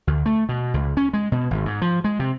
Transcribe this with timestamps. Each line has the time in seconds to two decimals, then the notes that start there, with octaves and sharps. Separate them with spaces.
0.07 D2
0.26 A3
0.49 B2
0.74 C#2
0.97 C#4
1.13 G#3
1.32 B2
1.51 G#1
1.66 G#2
1.82 F3
2.04 G#3
2.19 C3